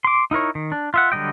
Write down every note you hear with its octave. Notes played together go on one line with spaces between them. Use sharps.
C6 D6
D#4 E4 A#4 C#5
D#3
D4
F4 E5 F#5
D3 F#3 G3 D#5 G5